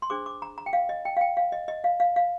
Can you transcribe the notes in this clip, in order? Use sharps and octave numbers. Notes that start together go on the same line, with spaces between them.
C6
D4 G#4 C5 D6
D6
A#5
A#5
G5
F5
D#5
G5
F5
G5
F5
D#5
D#5
F5
F5
F5